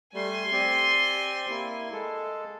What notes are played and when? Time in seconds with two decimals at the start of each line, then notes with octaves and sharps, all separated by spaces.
0.14 G3 A3 G#5 C6
0.52 C4 G4 D5
1.50 A#3 E4
1.92 G#3 A4